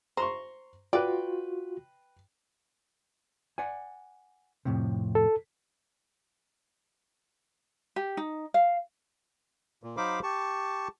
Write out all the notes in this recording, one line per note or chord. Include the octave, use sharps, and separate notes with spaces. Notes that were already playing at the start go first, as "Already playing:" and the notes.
C5 A#5 C6 C#6
F4 F#4 B4 D5 G5
D5 F#5 G#5
F2 A2 C3
A4
G4
D#4
F5
A#2
F#3 D#4 C5 F5 B5 D6
G4 A5 C#6